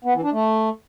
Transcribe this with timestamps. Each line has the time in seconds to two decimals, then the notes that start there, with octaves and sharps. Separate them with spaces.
0.04 B3
0.14 E3
0.23 D4
0.32 A3